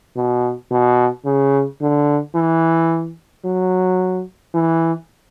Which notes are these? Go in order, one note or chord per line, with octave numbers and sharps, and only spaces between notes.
B2
B2
C#3
D3
E3
F#3
E3